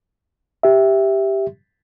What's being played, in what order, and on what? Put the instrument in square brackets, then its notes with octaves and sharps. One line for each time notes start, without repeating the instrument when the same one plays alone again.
[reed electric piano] G4 E5